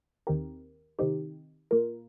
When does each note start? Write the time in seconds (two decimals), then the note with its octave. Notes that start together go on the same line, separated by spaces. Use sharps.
0.27 D#2 D#3 C4 G4 A#4
0.99 C3 D#3 C4 D#4 G4
1.71 A#2 A#3 F4 A#4